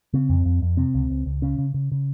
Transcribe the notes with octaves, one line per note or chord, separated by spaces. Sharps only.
C#3 C4
F2
F2
F2
C3 C4
C#2
C#2
C#2
C#3 C#4
C#3
C#3
C#3